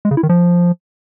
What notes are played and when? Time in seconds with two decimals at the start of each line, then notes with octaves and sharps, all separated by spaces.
0.05 G#3
0.11 C#3
0.17 E4
0.23 D#3
0.29 F3